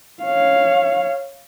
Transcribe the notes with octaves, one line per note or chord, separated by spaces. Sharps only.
C#5 F5